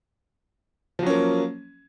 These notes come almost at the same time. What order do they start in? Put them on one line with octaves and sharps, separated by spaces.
F3 F#3 C#4 A#3